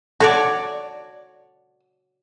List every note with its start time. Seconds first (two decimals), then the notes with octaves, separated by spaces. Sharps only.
0.20 F#4 A4 C#5 D5